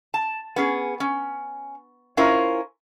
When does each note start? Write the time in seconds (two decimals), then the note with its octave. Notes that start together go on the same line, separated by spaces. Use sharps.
0.14 A5
0.56 B3 C#4 G#4
1.00 C#4
2.17 C#4 E4 F4 A#4 C5